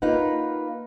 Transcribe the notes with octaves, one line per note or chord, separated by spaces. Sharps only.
A#3 D#4 F4 B4 F#5